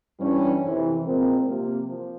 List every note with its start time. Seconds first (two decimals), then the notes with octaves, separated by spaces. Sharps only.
0.20 G2 E3 G3 C#4
0.62 F2 C3 E3
1.04 A#2 G#3 C4 F4 A#4
1.47 C3 F3 A#3
1.88 F3